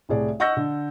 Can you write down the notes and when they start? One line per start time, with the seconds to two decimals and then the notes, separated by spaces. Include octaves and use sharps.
0.09 C2 A2 G#4 D5
0.40 D#5 F#5 C#6 E6 G6 A#6
0.57 D3